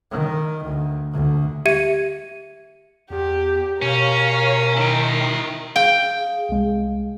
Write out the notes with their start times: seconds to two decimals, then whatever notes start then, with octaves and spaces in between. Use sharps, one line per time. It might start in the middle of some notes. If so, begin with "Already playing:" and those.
0.11 D#3
0.65 D2
1.13 D2
1.66 G4 E5 G#6 C#7 D#7
3.10 E2 G4
3.82 B2 C#4 A#4 C#5 F5
4.77 D#3 E4 G5
5.76 G#4 F5 G5
6.49 C2 G#3